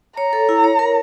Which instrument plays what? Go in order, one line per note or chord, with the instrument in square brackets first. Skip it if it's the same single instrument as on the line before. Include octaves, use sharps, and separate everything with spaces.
[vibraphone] C#5 [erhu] A#5
[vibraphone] A4
E4
C#5
A#4